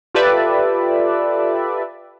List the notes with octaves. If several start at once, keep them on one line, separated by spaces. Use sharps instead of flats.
F4 G4 A4 B4 D5 E5